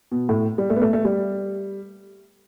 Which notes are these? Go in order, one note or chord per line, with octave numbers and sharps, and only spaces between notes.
B2
A2
G3
A3
B3
A3
A3
G3